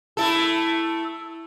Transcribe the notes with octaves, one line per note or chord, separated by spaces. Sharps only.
A3 E4 A4